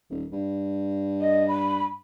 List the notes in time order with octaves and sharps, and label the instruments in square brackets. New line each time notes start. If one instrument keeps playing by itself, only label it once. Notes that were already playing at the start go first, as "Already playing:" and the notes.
[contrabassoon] D#1
G2
[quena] D#5
B5